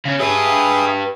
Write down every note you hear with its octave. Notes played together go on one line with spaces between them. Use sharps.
C#3 C#4
G4 G#4 B4 E5 D#6